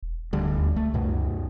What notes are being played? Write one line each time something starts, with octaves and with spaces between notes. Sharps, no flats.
E1
D2 D3 G3
D#2
C#2 A3
F#2 B2